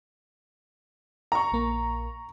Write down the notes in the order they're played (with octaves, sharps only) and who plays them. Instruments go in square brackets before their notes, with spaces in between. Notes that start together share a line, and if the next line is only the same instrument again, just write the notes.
[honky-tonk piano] A#5 C#6
[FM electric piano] A#1 A#3